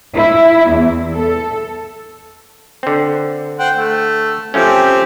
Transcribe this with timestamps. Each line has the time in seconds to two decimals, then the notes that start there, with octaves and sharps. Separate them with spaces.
0.15 E4
0.70 E2
1.13 A4
2.83 D3 C4
3.59 C5 F#5 G5
3.75 A3
4.54 F3 A3 C4 C#4 G4